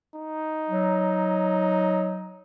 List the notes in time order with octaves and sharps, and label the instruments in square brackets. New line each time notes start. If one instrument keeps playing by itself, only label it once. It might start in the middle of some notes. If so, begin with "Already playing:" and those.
[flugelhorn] D#4
[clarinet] F#3